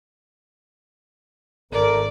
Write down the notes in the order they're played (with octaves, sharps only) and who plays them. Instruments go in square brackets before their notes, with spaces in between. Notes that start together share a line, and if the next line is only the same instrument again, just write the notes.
[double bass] G#1 [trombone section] A3 A#4 [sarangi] D5